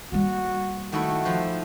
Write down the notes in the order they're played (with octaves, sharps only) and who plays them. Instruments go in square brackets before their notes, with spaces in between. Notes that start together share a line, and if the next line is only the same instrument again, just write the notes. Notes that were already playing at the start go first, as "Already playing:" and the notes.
[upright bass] G3 A#3 [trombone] F#4
[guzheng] D#3 A3 E4 [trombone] F#4
[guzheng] F3 C5